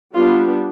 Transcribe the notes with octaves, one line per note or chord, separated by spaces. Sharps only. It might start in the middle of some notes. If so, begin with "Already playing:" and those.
G3 B3 D4 F4